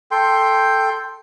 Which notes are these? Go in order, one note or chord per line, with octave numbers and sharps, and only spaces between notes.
A4 G5 C6